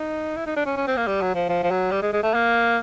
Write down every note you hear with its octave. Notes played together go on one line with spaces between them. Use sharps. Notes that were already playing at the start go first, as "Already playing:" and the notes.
Already playing: D#4
E4
D#4
D4
C#4
C#4
C4
A#3
G3
F#3
F3
F3
F3
F#3
G3
G#3
G#3
A3
A#3